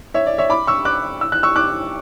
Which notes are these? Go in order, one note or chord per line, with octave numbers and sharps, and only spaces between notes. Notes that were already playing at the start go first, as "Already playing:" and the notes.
C#5 E5
D5
C#5 E5
B5 D6
C#6 E6
D6 F#6
E6
F#6
C#6 E6
D6 F#6